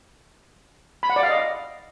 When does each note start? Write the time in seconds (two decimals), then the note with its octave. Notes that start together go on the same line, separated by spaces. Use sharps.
1.03 B5
1.10 F#5
1.16 D5
1.23 F5
1.30 D#5